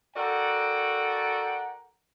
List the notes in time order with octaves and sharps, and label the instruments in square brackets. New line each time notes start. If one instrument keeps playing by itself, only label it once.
[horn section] F#4 A4 A#4 D5 F#5 G5